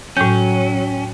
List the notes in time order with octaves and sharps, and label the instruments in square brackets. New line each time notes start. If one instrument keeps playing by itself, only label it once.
[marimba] A2 G6 [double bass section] F#3 [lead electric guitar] C#4 [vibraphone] G5